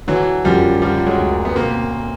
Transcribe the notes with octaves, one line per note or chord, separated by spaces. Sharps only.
D3 E3 F#3
F#2 F3 G3
D3 F3 G3
F#3 G#3
D2
B3
B2 A#3 C4